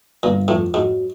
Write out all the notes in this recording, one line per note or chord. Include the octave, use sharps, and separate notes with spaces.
G1 A#2
F2 A2
G#2 F#3